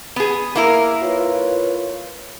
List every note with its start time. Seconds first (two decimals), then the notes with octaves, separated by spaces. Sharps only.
0.16 B3 G#4
0.56 A#3 E4 A#4
1.03 F4 B4 C#5